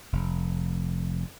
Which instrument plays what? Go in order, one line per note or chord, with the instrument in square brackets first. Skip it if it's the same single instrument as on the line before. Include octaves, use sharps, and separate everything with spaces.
[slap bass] F1